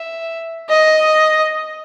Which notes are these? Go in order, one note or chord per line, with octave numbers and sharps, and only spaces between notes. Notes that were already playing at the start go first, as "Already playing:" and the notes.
Already playing: E5
D#5